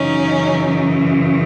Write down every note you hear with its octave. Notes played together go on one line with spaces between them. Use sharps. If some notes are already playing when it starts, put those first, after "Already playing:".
Already playing: F#2 C#3 E3 C#4 D#4